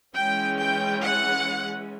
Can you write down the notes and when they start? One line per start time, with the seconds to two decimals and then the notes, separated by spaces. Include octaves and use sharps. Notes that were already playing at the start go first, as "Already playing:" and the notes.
0.14 E3 G#3 C#4 G5
0.58 G5
1.03 F#5